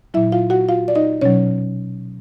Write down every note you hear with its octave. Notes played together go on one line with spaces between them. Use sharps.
A#2 F#3 E4 E5
F4 F5
F#4 F#5
F4 F5
D5
D#4 D#5
B2 F#3 C#4 C#5